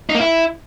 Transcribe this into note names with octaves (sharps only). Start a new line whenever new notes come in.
D#4
A#3
E4